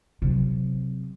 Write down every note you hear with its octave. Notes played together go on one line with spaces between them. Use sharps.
C3 F#3